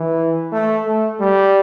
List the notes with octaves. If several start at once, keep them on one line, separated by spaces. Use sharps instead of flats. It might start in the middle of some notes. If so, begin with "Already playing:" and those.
Already playing: E3
A3
A3
G3